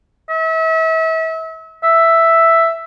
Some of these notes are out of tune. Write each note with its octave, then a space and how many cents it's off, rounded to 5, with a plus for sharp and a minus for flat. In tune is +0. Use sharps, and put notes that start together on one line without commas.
E5 -35
E5 +5